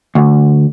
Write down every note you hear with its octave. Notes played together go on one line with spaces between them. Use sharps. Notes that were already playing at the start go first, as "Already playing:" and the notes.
D2